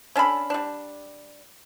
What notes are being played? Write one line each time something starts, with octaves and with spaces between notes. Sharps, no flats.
C#4 D4 A4 B5
G3 D4